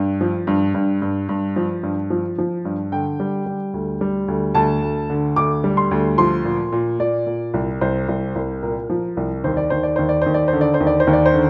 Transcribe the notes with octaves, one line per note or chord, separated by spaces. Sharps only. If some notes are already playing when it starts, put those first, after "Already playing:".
Already playing: G2
F3
G2
G2
G2
G2
F3
G2
F3
F3
G2
D3 G5
G3
G3
D2
G3
D2
D2 A5
D2
D3
D2 D6
G3
C6
D2
F3 C6
A#2
A#2
A#2 D5
A#2
C2
C2 C5
C2
C2
A#2 A#4
F3
C2
D#2 C5
D5
D#2 C5
D5
D#2 C5
D5
D#2 C5
D5
C5
D3
D5
C5
D#2
D5
C5
D#2
D5
C5
D3